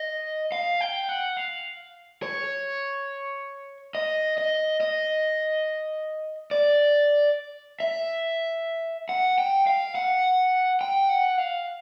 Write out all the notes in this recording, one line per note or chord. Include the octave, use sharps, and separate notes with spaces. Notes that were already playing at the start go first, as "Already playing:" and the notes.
Already playing: D#5
F5
G5
F#5
F5
C#5
D#5
D#5
D#5
D5
E5
F#5
G5
F5
F#5
G5
F#5
F5